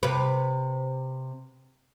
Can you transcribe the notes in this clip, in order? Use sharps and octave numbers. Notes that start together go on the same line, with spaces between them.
C3 B4